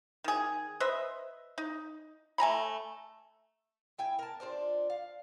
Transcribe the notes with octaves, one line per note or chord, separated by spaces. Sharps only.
D#3 G#4
B4 C5 D#5 E5
D#4
A3 G#5 A#5 B5
E4 G5 G#5
A#4 A5
D4 F4 C5 D5
F5